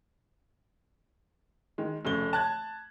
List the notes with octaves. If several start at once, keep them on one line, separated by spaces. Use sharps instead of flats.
D#3 G#3
F1 C#3 A3 G7
A5 F#6 G#6